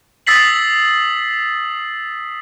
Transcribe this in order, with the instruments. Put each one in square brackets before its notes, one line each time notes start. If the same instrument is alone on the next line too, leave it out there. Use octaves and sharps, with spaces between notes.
[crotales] D#6 E6 A6 B6 C7 F#7